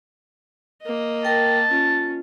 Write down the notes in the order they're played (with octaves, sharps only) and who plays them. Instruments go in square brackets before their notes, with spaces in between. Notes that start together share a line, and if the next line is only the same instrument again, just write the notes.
[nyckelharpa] A#3 D#5
[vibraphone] A#4 G5 [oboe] A5
[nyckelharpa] C#4 [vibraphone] F4